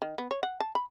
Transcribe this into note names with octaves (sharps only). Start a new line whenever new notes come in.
D#3
B3
C#5
F#5
A5
B5